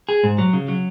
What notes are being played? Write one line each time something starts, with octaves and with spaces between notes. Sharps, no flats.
G#4
G#2
F#3
C#3
F#3